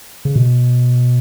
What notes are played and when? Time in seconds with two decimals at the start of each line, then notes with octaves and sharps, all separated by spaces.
0.25 C#3
0.36 B2